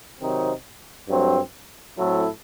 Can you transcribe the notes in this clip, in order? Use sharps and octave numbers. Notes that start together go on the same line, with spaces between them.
C3 D#3 F#3 C4 D#4
G2 F#3 A3 C4
A2 F#3 C4 E4 A4